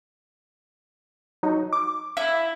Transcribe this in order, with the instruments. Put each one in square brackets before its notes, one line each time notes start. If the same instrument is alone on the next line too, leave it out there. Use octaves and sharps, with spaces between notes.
[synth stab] F#3 D#4
D6
[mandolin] E4